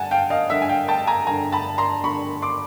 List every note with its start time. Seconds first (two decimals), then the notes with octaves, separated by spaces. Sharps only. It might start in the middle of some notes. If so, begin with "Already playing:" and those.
Already playing: G2 D3 F#5 G#5 A5
0.11 F5 G5
0.30 D#5 F5
0.50 G2 D3 E5 F#5
0.62 G#5
0.69 F5 G5
0.88 G5 A5
1.07 G#5 A#5
1.27 G2 D3 G#5 A#5
1.52 A5 B5
1.78 A#5 C6
2.03 G2 D3 B5 C#6
2.42 C6 D6